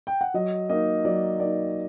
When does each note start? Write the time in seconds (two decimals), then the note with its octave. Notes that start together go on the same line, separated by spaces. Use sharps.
0.07 G5
0.21 F#5
0.34 F#3 D#5
0.69 A#3 D#4 D#5
1.05 F#3 D5
1.40 A#3 D#4 D5